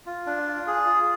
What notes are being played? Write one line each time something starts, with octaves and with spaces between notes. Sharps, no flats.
F4
D4
F4
G#4
F4